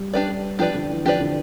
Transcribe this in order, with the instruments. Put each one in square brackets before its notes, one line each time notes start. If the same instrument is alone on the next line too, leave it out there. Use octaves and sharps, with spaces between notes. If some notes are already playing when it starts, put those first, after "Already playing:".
Already playing: [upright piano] G3
[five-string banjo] D4 G4 B4 D5
[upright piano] F3 [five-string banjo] D4 G4 B4 D5
[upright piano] D3
E3
[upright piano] F3 [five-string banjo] D4 G4 B4 D5
[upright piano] D3